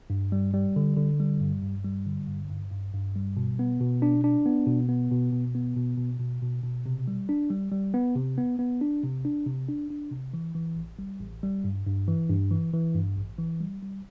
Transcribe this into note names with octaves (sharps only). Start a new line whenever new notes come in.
G2
G3
G3
D3
D3
G3
G2
G2
G3
D3
G2
G2
G2
G2
G3
B2
B3
B2
D4
D4
B3
B2
B3
B2
B2
B3
B2
B2
B2
B2
B2
C3
G3
D4
G3
G3
B3
C3
B3
B3
D4
C3
D4
C3
D4
D4
C3
E3
E3
A1
G3
A1
G3
G2
G2
E3
G2
E3
E3
G2
A1
E3
G3
G3